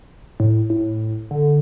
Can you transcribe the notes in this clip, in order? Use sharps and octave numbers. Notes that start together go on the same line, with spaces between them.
A2
A2
D3